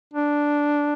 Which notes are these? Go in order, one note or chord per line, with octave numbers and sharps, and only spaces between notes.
D4